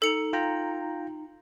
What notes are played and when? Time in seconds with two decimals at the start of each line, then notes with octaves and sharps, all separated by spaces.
0.02 D#4 A4 C#7 F7
0.33 F4 G5 A#5